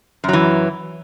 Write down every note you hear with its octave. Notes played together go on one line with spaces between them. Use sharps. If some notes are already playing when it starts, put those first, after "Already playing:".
F#2 E3 F#3